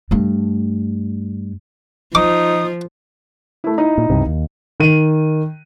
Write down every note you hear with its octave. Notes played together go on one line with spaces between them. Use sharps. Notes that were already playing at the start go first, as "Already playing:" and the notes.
G2 A3
F3 D#4 D6 D#6
A3 E4
D#4 E4 D#5
A#2
C#2 G2 C3
D#2
D#3 D#7